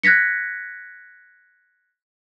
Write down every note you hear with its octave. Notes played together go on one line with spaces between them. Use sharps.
F#6 G#6 A#6 B6 C#7